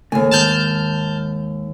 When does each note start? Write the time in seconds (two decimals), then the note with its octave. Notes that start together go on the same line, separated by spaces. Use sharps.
0.12 D#2 C#3 A3 G#5
0.31 G#2 D#3 A5 F6 G6